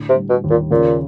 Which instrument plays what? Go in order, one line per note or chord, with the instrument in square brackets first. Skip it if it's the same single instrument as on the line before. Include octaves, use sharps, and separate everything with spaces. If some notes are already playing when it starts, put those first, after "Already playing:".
Already playing: [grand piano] A2 D3
[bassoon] C3
[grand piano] G3
[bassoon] B2
[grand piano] D#2
[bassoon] A#2
[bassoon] A#2 [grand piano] C#3